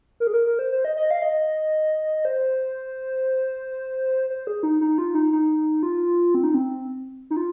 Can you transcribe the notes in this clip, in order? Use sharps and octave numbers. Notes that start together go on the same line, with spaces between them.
A#4
G#4
A#4
A#4
C5
C5
D#5
D#5
F5
D#5
C5
C5
G#4
D#4
D#4
F4
D#4
D#4
F4
C4
D#4
C4
D#4
F4